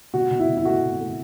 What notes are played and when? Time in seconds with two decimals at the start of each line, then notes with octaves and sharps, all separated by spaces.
0.14 B2 F#4
0.31 B2
0.40 E4
0.48 B2
0.57 E4
0.65 A3 F#4
0.83 B2
1.01 A3